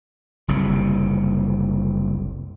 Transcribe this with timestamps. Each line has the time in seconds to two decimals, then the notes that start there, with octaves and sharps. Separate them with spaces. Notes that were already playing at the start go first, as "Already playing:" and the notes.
0.48 F#1 C2 C3